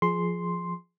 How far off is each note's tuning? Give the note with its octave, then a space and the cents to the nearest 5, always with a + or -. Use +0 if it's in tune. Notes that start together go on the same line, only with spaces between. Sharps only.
F3 +0 G#4 +15 C6 +0